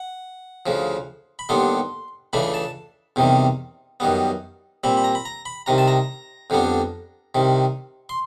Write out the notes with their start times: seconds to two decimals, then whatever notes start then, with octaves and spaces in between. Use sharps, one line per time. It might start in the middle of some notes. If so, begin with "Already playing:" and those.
Already playing: F#5
0.66 D2 C#3 F3
1.39 B5
1.49 D#2 D3 G3 B3 D4 C6
2.33 C#2 C#3 E3 A3 D4 B5
2.54 A5
3.16 E2 C3 D#3 G3
4.00 F#2 D#3 G3 B3
4.84 A#2 G3 C4 B5
4.97 B5
5.04 A#5
5.15 B5
5.25 A#5
5.45 B5
5.66 C2 C3 D#3 A#5
5.78 A5
5.88 A#5
6.50 F2 D3 G3 B3 D4
7.35 C2 C3 D#3
8.09 C6